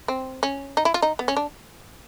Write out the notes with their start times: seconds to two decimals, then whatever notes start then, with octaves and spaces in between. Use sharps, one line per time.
0.08 C4
0.43 C#4
0.77 D#4
0.85 E4
0.94 F4
1.02 D#4
1.19 B3
1.28 C#4
1.37 D4